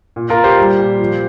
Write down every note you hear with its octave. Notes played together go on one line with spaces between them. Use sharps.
A#2
F4 A#4
A#2
G4 C5
G3
A#2
F3